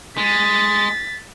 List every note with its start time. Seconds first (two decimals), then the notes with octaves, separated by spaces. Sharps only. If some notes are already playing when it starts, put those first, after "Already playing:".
0.18 G#3 A6 B6